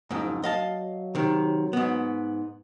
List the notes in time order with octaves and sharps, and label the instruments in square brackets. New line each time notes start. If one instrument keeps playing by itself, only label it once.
[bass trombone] F#1 [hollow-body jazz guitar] F2 G#2
[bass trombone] F#3 [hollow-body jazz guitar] D#5 F5 A5
[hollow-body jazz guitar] C3 D#3
G#2 B3